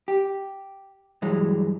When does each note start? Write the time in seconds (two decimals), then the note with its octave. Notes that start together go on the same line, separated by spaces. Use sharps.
0.08 G4
1.22 G2 E3 F#3 G#3